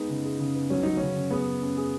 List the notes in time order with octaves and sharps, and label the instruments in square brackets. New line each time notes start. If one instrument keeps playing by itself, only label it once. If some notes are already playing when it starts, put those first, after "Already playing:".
Already playing: [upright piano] G#3 B3 G#4 [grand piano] D#4
[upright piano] C#3
G#4
C#3
B3
[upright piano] F#3 [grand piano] C#4
[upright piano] F#3 [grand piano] D#4
[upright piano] C#3 [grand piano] C#4
[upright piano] C#3
[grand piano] B3 [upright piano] G#4
[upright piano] G#4
C#4
G#4